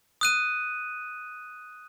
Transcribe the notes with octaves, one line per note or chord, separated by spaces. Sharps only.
D#6 F#6 D#7